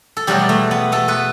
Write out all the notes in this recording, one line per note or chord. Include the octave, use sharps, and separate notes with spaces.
A4
E2 B2 F#3 G3 A3 G4
A3
B3
A3 A4
B3 B4